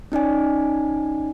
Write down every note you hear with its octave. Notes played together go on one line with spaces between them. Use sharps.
C#4 D#4 D5 G#5